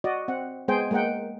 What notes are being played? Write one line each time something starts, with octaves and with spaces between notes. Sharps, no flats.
F#4 D5 D#5
C4 F#5
G#3 B3 G#4 C5 G5 G#5
G#3 A#3 A#4 F#5 G5